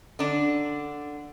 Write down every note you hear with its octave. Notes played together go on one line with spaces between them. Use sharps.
D3 D4